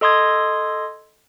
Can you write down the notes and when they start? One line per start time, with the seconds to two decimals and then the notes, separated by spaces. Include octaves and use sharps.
0.01 A4 D#5 C6 D#6 G#6